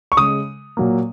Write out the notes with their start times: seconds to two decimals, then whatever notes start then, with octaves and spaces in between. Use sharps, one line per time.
0.12 C#6
0.17 C#3 G#3 D#6
0.77 A#2 F#3 A#3